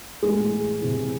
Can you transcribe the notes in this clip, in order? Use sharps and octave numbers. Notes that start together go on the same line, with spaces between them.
A2 E3 G#3
C3 E3